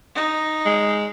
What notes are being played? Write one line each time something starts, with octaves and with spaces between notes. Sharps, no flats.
D#4
G#3